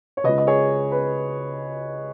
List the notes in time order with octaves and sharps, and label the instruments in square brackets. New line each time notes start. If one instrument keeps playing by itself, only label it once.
[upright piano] C#5
C#2 C#3 B4 D#5
D#5
G#4 C#5
B4